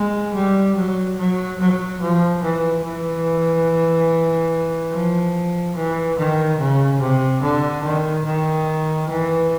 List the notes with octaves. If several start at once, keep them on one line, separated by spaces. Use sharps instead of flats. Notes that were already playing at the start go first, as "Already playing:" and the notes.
Already playing: G#3
G3
F#3
F#3
F#3
F3
E3
E3
F3
E3
D#3
C#3
C3
D3
D#3
D#3
E3